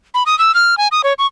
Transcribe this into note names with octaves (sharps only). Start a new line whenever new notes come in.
B5
D#6
E6
F6
G#5
D#6
C#5
C#6